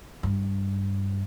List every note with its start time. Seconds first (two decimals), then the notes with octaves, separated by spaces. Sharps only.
0.23 G2